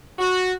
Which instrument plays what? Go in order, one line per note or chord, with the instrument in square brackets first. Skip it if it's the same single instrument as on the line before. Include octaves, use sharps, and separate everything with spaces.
[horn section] F#4